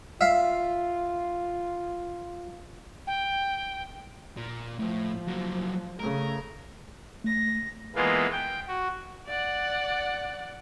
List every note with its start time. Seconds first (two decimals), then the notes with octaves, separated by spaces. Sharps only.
0.21 F4 E5 F5
3.07 G5
4.37 A#2
4.79 A2 F3
5.27 F#3 A#3
5.99 C#3 A3 A#4
7.24 A3 A#6
7.95 E3 G#3 A#3 B3 F4
8.32 G5
8.68 F#4
9.27 D5 F#5